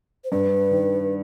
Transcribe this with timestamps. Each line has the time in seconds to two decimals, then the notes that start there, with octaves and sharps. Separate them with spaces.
0.24 C5
0.32 G2 B4
0.71 D#3